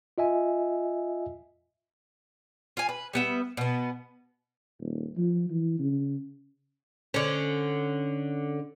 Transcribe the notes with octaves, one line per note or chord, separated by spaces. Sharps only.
F4 D#5 E5 G#5
F4 G#5
B4
G3 B3 E5
B2 B3
D#1
F3
E3
C#3
D3 C#4